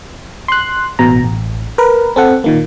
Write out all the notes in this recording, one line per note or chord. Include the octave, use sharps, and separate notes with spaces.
C6 F#6
A1 B2 A#5
A1
A#4 B4
C4 A4 F#5
A#2 D#3 A#3